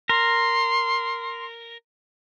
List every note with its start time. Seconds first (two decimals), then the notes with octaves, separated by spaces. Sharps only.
0.09 A#4 C6